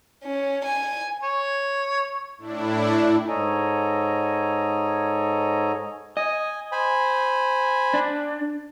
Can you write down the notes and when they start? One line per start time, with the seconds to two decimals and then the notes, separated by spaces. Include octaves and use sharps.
0.24 C#4
0.65 G#5
1.23 C#5
2.38 A2 D4 E4
3.26 G#2 A4 C#5 D#5 G#5 A#5
6.17 D#5 G#5
6.72 C5 G#5 B5
7.94 D4